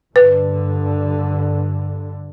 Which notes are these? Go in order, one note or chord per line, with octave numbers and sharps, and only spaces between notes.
G2 D3 B4